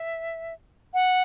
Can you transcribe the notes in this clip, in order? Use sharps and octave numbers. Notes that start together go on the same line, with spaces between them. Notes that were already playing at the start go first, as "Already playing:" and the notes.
Already playing: E5
F#5